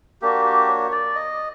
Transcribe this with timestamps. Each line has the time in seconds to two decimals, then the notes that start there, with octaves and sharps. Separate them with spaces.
0.22 A#3 D4 F#4 G4
0.45 G4
0.69 C#5
0.92 D5
1.16 D#5